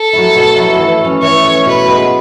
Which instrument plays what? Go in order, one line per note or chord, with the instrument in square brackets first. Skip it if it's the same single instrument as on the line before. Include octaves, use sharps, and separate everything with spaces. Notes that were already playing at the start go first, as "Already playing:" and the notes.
Already playing: [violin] A4
[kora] F#3 A3 E4
B2
F#3 A3 E4
E3
A3 C#4
[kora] E3 [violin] C#5
[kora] A3 C#4
[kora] B2 [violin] B4
[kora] G#3 B3